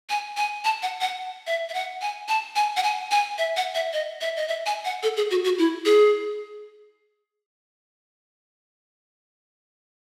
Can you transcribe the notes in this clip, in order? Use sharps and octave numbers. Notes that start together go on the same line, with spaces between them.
G#5
G#5
A5
F#5
F#5
E5
E5
F#5
G#5
A5
G#5
F#5
G#5
G#5
E5
F#5
E5
D#5
E5
D#5
E5
G#5
F#5
A4
G#4
F#4
F#4
E4
G#4